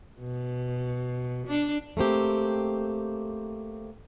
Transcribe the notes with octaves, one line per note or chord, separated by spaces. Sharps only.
B2
D4
A3 A#3 C4 G4